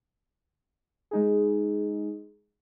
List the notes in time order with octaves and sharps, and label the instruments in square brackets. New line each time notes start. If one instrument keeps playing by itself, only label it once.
[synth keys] G#3 D#4 G#4